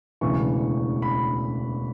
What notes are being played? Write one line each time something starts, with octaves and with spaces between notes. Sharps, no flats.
E1 D2 C#3 E3 C#6
B5